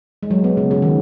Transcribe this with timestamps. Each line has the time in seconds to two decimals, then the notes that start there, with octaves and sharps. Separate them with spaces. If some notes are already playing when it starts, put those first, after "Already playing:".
0.23 G#3
0.31 F#3
0.44 B3
0.57 C#3
0.71 C#3
0.82 D#3